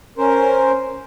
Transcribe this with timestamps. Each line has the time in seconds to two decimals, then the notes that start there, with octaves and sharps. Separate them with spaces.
0.18 C#4 A#4 C5